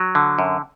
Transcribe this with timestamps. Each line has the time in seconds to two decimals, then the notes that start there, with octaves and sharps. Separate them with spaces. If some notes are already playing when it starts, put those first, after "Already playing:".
Already playing: F#3
0.15 D3
0.39 F#2